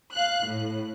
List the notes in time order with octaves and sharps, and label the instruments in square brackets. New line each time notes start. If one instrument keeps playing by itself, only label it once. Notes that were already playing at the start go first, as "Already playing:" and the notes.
[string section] F5 F#6
A2